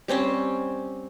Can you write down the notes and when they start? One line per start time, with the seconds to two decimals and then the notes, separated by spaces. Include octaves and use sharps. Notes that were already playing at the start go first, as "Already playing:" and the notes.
0.08 G3 C4 C#4 C5